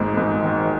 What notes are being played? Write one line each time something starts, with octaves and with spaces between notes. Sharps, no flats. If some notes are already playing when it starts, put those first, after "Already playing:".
Already playing: G#1 G#2 A#3
G#2
D#3